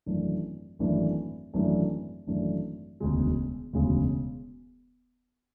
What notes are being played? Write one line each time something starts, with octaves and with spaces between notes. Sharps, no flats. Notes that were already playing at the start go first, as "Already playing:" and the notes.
G#1 F#2 E3 A3 D4
G#1 F#2 E3 A3 D4
G#1 F#2 E3 A3 D4
G#1 F#2 E3 A3 D4
E1 D2 C#3 G#3
E1 D2 C#3 G#3